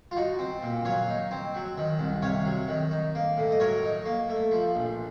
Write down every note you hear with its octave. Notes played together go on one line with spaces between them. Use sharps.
F4
D#4 F#4
C4
A#2
F#3 C#5 F5
D#4
C4
F#3
D#3
C2
C3 C#5 F5
F#3
D#3
D#4
A#3
A2
D#5
F#3 A#4 C#5
D#4
A#3
A3
F3
A#1